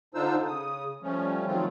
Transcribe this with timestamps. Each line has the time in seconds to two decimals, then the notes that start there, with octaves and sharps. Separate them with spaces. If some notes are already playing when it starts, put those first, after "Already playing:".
0.15 D3 D4 D#4 F4 C5 E6
0.47 C#3 D#6
1.02 F3 G3 A3 C#4
1.46 D#3 F3 F#3 A3 C4 F4